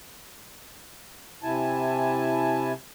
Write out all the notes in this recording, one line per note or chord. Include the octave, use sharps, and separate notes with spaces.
C3 E4 G#5 A5